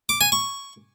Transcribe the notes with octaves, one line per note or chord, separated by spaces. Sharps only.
D6
G#5
C#6